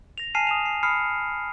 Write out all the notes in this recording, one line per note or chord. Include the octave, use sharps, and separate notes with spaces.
A#6 F7
G#5 A5 F6 C7 D#7 E7
D#6 E7 F7
C7
B5 D#6 F6 C7 C#7